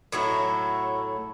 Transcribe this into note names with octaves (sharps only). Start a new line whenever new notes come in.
A2 F#3 A3 E4